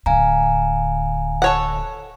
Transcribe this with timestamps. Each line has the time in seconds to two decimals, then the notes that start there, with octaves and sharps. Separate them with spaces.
0.06 D1 D3 F5 G#5 A#5
1.42 A4 C#5 F#5